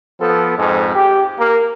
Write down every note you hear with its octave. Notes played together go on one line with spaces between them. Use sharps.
F3 B3 A4
F2 G#2 G#3
G4
A#3